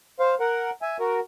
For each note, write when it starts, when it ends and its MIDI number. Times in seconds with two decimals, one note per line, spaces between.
0.20 0.35 72
0.20 0.35 77
0.40 0.70 70
0.40 0.70 78
0.82 0.97 76
0.82 0.97 80
1.00 1.20 66
1.00 1.20 70